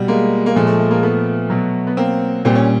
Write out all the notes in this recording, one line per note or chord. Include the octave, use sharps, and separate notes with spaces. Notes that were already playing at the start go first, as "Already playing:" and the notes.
Already playing: B2 G3
G#3 A#3
A#3
A#2 F3 G#3 A3
A3
A3
G#3 A#3
A3 B3
B2 F#3
B3
A#3 C4
A#2 G3 C4
C#4